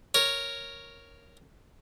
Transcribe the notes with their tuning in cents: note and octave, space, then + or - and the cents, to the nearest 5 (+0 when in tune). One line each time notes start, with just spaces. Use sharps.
A#4 +0 C#5 +0